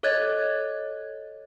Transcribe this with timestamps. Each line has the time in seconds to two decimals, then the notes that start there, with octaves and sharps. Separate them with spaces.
0.03 A4 C#5 D#5 F#6 G#6 A6